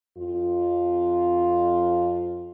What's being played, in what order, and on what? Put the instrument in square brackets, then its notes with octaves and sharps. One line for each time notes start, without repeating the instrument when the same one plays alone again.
[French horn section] F2 F4